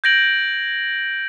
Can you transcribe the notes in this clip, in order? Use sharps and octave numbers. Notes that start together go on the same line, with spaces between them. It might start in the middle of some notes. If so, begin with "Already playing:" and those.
G6 G#6 A#6 D7 F#7